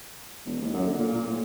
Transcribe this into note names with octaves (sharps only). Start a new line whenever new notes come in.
E1
D#2
F#2
D3
A#2
A#2
A2